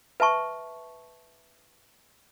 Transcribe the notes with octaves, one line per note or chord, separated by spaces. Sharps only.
B4 E5 A5 C#6